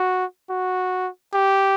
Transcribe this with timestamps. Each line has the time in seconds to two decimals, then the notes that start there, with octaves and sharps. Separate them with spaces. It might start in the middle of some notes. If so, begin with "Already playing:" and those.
Already playing: F#4
0.50 F#4
1.34 G4